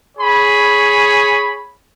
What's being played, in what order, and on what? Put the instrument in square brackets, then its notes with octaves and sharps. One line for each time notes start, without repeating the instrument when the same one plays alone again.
[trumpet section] G#4 C#5 B5